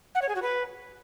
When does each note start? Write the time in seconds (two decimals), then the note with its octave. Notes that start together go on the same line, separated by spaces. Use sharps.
0.15 F#5
0.22 C#5
0.29 G#4
0.35 F#4
0.42 B4